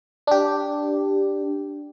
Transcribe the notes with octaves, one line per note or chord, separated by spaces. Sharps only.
D4 G4